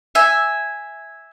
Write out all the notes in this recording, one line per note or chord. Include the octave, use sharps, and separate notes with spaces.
E5 G#5